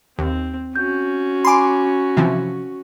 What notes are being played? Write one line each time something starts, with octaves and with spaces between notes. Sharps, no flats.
D#2 C4
C#4 F#4 G6
G#5 B5 C6 D6
C3 E3 F3